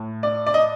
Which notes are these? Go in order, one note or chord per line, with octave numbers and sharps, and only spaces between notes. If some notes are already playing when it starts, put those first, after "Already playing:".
Already playing: A2
D5
D5
D#5